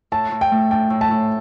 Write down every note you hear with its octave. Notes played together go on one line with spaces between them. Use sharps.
A2 A5
A2
G5
A3
D4 G5
A2
A5
A2